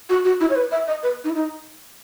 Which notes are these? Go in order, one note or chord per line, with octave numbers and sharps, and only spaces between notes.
F#4
F#4
E4
C#5
B4
E5
D#5
B4
D#4
E4
D#4